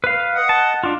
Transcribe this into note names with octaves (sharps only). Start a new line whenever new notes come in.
B4 F5
D#5 F#5
A5
D4 F4